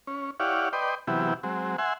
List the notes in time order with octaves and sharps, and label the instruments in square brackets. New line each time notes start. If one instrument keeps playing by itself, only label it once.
[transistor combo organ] C#4
E4 G4 C#5 D5 F5 F#5
B4 D5 D#5 G5 C6
C3 E3 F#3 B3 E4 G4
F#3 G#3 C4
E5 F#5 G#5 C6